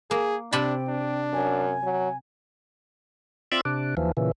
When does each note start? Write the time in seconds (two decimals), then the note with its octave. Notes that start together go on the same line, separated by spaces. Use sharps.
0.11 A#3 G#4
0.53 C3 D4 G5 A5 B5
0.88 D4
1.33 F#2 G#5
1.83 F#3
3.52 C4 F4 D5 E5
3.65 C3 D4
3.97 D#2 E3 F3
4.17 A#2 C#3 E3